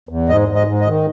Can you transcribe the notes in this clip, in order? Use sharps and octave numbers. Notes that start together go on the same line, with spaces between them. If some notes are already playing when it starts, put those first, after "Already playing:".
E2
G#2 D#5
G#2
D#5
G#2
D#5
D#3